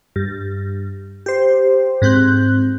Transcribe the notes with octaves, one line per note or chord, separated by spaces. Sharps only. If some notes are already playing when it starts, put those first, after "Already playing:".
G2
G4 C5
G#2 C4 F#6 G6